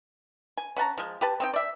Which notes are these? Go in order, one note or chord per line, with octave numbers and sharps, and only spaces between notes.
G#5
C#4 F#5 A5 A#5
F3 G#3
G4 B4 A5
C4 D#4 G5
D5 E5